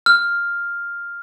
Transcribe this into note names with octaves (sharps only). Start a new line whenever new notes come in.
F6